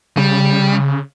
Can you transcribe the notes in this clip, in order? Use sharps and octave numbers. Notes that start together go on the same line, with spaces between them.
C#3 G3